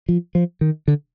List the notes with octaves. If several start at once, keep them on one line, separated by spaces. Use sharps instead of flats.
F3
F3
D#3
D3